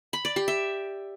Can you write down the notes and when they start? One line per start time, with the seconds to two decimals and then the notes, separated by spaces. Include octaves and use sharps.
0.13 B5
0.25 D5
0.36 G4
0.48 E5